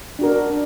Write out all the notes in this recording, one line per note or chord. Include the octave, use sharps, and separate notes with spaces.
D4 F#4 A#4
D4